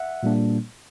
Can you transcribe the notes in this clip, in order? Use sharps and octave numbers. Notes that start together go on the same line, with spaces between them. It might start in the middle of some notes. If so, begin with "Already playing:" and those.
Already playing: E5 F#5
A#2 G3 A#3 D4